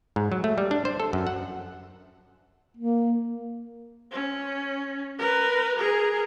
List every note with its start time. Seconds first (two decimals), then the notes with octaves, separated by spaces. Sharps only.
0.16 G#2
0.32 F#3
0.44 A3
0.58 G3
0.71 D4
0.85 C5
1.00 A4
1.13 F#2
1.27 F#5
2.77 A#3
4.12 C#4
5.18 A#4 B4
5.77 G#4 A#4